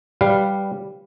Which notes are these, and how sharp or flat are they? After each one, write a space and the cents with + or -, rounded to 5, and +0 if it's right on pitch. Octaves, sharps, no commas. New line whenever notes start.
G3 +0 B4 +0 F5 -5